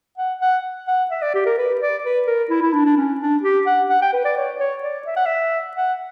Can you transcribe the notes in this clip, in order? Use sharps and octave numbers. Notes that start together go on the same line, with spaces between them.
F#5
F#5
F#5
E5
D5
G4
A#4
B4
D5
B4
A#4
E4
E4
D4
D4
C#4
D4
G4
F#5
F#5
G5
B4
D5
C#5
C#5
D5
E5
F#5
E5
F#5